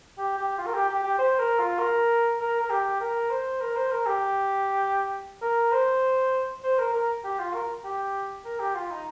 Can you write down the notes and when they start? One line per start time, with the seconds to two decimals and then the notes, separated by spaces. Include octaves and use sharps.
0.18 G4
0.37 G4
0.58 F4
0.66 A#4
0.74 G4
0.88 G4
1.03 G4
1.18 C5
1.39 A#4
1.59 F4
1.79 A#4
2.40 A#4
2.61 A#4
2.70 G4
3.00 A#4
3.30 C5
3.61 A#4
3.76 C5
3.91 A#4
4.06 G4
5.42 A#4
5.72 C5
6.63 C5
6.78 A#4
6.93 A#4
7.24 G4
7.39 F4
7.53 A#4
7.84 G4
8.45 A#4
8.59 G4
8.74 F4
8.90 D#4